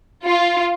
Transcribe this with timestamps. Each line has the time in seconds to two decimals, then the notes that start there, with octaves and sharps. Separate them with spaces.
0.24 F4